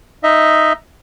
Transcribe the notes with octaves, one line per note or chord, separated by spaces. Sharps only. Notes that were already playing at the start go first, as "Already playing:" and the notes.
D#4 D#5 E5